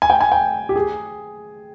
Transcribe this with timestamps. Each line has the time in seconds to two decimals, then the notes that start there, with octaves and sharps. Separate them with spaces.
0.02 G#5
0.10 G5
0.21 G#5
0.32 G5
0.69 G4
0.76 G#4